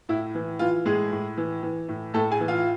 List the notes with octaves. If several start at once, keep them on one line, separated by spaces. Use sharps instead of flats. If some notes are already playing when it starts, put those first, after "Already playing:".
A2 E4
E3
E3 F4
A2 G#3 G#4
A2
E3
E3
A2
A2 A3 A4
G#4 G#5
E3
F4 F5